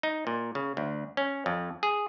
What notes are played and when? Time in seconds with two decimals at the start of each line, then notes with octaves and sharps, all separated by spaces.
0.03 D#4
0.27 A#2
0.55 C#3
0.77 D2
1.17 C#4
1.46 F2
1.83 G#4